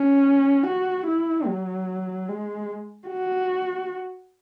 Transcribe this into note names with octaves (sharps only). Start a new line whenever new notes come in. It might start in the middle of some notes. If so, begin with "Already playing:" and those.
Already playing: C#4
F#4
E4
F#3
G#3
F#4